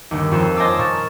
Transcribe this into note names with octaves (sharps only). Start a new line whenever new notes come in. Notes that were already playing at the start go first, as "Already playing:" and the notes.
G1 D#2
F2 F4 C5 G6 E7
C5 D#5 G#5 A5 D6 E6
A#2 C#6 F6 A6 E7